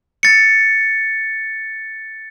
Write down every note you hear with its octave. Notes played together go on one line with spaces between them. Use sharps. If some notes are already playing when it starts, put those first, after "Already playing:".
A6 C#7